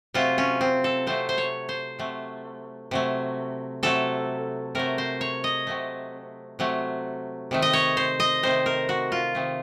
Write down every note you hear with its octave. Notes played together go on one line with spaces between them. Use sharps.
C3 F#3 A3 F4
C#4
C4
A4
C3 F#3 A3 C5
C5
C#5
C5
C3 F#3 A3
C3 F#3 A3
C3 F#3 A3 A4
C3 F#3 A3 A#4
C5
C#5
D#5
C3 F#3 A3
C3 F#3 A3
C3 D#3 A3
D#5
C#5
C5
D#5
C3 D#3 A3 C5
A#4
F#4
F4
C3 D#3 A3